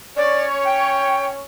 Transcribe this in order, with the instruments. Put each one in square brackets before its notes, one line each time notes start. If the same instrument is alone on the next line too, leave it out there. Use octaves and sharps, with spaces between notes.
[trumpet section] C#4 C#5 [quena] D5
[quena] G5